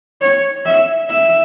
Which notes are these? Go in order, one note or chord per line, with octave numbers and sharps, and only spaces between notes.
C#5
E5
E5